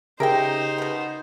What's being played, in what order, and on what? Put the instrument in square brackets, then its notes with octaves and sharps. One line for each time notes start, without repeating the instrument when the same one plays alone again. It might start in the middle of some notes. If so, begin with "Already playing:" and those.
[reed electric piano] C#3 G4 G#4 [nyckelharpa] D#4 C5 [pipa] A#4 E5 G5
[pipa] B2 B3